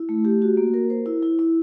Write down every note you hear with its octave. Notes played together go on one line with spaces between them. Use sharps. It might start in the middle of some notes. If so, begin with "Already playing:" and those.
Already playing: E4
A3
G4
F#4
A#3
A#4
C5
E4
E4
E4